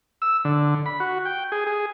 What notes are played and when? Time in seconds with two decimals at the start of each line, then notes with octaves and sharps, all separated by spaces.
0.22 E6
0.45 D3
0.86 B5
1.00 F#4
1.25 G5
1.52 G#4
1.67 G#4